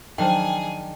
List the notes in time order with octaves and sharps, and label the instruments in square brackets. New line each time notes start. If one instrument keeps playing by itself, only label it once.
[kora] D#3 D4 [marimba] F3 F#3 C5 [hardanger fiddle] G#4 G#5 [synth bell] G5